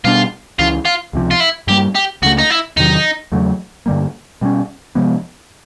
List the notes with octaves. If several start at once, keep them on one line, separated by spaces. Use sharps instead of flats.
B2 G3 B3 D4 F4
C#2 C#3 E3 F4
F4
C#2 C3 F3
F4
E4
G2 E3 G3 A#3 G4
G4
C#2 C#3 F3 A3 F#4
D#4
E4
E2 C3 D#3 F#3 D#4
E2 C#3 F#3 A3
G2 D3 G3 A#3
B2 G3 A#3 C#4
C3 F3 G#3 B3